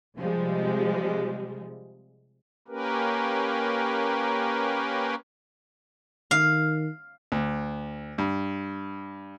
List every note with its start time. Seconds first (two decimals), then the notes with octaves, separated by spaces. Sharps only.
0.18 C3 F3 G3 G#3
2.68 A#3 C#4 G4 A#4 B4
6.31 D#3 F5
7.32 D2
8.18 G2